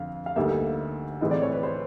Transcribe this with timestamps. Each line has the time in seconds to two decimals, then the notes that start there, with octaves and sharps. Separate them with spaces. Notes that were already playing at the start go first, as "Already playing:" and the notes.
Already playing: F2 D3 F5
0.26 F5
0.36 D2 D3 G3 A#3 D#4 E5
1.21 A2 E3 G#3 C4 D#5
1.31 D5
1.42 C#5
1.52 B4
1.63 C5